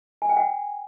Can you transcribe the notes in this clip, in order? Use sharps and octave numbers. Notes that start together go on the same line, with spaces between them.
G#5
G5
F#5